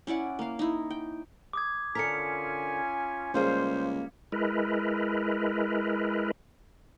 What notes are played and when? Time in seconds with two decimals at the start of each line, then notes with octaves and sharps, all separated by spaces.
0.07 C#4 E4 D5 F#5
0.39 A#3 F5
0.59 D#4 E4
0.90 G5
1.53 D6 D#6 G#6
1.95 D3 C#4 F4 A4 A#4 G#5 B6 C#7
3.34 C#2 G3 A#3 G#4 C5
4.32 G#3 E4 A#4 B4